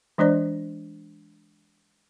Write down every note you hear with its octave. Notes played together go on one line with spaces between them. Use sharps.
E3 G#3 D4 C5 D5